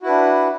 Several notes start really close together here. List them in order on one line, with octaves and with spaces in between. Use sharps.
F#4 E4 B4 D4